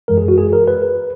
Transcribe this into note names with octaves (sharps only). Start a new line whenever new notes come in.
F#2 E3 G#3 A#4
G#4
F#4
G#4
A#4
B4